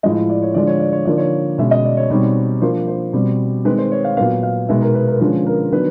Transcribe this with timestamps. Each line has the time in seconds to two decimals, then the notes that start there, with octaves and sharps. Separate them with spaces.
0.03 A2 F3 G#3 D#5
0.29 D5
0.42 C#5
0.54 D3 F3 G#3 D5
0.67 C#5
0.80 D5
0.93 C#5
1.05 D3 F3 A#3 D#4 D5
1.18 C#5
1.58 B2 G#3 C#4 E5
1.71 D#5
1.84 D5
1.97 C#5
2.10 B2 G3 C4 D#4 C#5
2.62 F3 A#3 D4 C5
2.88 C5
3.13 B2 G3 C4
3.65 D#3 G#3 C4 B4
3.78 C5
3.92 C#5
4.04 F5
4.17 A#2 F#3 B3 F5
4.43 F5
4.69 B2 G#3 B3 D#4 E5
4.82 A#4
4.94 B4
5.07 A#4
5.20 D3 F3 G#3 C#4 B4
5.47 A#4
5.72 D#3 F#3 B3 D4 B4